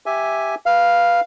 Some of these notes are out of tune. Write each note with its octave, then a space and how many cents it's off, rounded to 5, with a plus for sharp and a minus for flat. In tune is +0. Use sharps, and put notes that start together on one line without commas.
G4 +0 E5 +0 G#5 +0
B4 -15 F5 +0